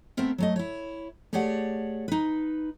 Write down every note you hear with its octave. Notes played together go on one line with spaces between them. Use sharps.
A3 B3 C4 A#4 E5
F#3 A3 D#5
E4 C#5
A3 G4 G#4 C#5 D5 F#5
D#4 B4